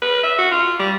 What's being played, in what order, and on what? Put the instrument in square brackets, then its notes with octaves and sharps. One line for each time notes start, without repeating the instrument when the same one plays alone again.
[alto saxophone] B4
E5
F#4
F4
G3